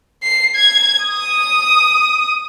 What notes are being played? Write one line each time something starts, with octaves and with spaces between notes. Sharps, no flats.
C7
G#6
D#6